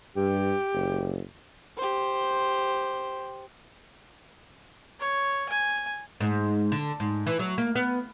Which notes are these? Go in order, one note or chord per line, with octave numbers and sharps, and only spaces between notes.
G2 G4
F#1
G4 C5
C#5
G#5
G#2
D3
G#2
E3
F#3
A#3
B3